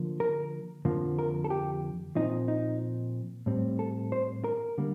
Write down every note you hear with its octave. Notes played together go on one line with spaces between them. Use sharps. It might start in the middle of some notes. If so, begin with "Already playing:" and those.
Already playing: D3 F3 A#3
A#4
F2 D3 F3 A#3
A#4
A4
G4
A#2 F3 C4 D#4
D#4
A2 G3 C4
A4
C5
A#4
D3 G3 A#3